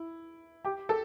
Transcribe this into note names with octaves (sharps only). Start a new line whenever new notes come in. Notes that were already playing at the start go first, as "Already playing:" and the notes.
Already playing: E4
G4
A4